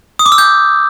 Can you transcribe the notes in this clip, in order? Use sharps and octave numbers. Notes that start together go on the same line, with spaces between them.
D#6
D6
E6
G6